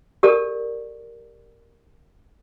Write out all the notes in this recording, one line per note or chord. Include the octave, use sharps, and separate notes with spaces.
G4 A4 A#4 D5